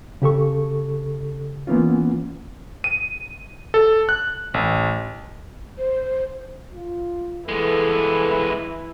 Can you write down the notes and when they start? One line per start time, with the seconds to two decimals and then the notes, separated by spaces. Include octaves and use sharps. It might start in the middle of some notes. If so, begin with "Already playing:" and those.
0.22 C#3 G4 A4 C#6
1.67 E3 A#3 B3 C#4 F4
2.84 D#7
3.74 A4
4.09 F#6
4.54 A1
5.78 C5
6.74 F4
7.48 E3 G#3 B3 A4